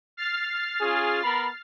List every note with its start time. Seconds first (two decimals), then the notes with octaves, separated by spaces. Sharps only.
0.17 F6 A6 C7
0.80 C#4 F4 G#4
1.24 B3 A#4 B5